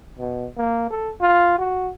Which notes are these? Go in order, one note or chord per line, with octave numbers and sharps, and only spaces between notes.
B2
A#3
A4
F4
F#4